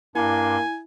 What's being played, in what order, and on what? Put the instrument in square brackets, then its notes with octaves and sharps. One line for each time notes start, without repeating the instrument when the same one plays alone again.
[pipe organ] G2 D4 C6 [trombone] A#3 [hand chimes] E4 [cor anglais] G#5